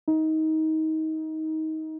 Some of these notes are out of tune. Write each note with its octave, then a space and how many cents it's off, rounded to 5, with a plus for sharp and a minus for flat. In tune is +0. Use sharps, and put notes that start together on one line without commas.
D#4 +20